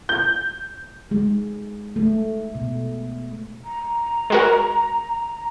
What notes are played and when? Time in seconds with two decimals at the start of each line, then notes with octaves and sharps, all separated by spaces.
0.09 G6
1.11 G#3
1.96 A3
2.55 B2
3.64 A#5
4.30 G#3 F#4 A#4